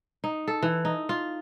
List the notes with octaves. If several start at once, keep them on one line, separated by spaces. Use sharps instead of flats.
D#4
A4
E3
D#4
F4